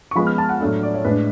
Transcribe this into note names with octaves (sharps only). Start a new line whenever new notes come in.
C#6
F3 G#3 B3 B5
F6
A5
F#5
A2 F#3 A3 D4
D5
C#5
A2 G#3 D4 B4